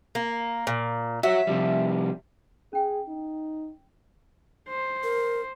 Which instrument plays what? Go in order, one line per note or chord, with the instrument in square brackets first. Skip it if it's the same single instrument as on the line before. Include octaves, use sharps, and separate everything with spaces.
[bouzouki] A#3
A#2
[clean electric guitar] F#4 C#5 [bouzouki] E5
[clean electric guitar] C3 F3 G3
[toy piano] C#4 G5 [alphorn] G#4
[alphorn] D#4
[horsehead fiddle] C5
[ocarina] A#4